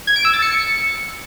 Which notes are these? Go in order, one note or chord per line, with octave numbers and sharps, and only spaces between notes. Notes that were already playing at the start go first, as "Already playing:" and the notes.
G#6
D7
E6
A6
C#7